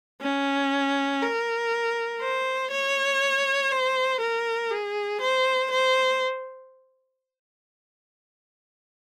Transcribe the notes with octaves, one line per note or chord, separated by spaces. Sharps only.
C#4
A#4
C5
C#5
C5
A#4
G#4
C5
C5